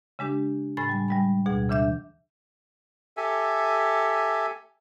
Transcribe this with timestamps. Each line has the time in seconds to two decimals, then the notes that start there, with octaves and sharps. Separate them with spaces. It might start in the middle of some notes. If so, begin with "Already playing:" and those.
0.19 C#3 G#3 D4 G4
0.77 A2 C#3 G#5 B5 A6
0.89 G3 G#5
1.08 G3 G#3 B5
1.46 D2 B2 G#4 F#5
1.69 C#3 E3 D4 E5 G6
3.17 G4 A4 E5 G#5